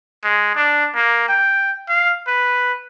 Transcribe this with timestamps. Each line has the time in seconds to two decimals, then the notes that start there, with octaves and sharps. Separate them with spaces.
0.24 G#3
0.56 D4
0.95 A#3
1.29 G5
1.89 F5
2.28 B4